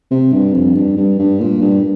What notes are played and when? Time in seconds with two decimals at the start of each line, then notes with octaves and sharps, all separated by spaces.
0.11 C3
0.33 G2
0.54 F2
0.75 G2
0.97 G2
1.19 G2
1.41 A#2
1.62 G2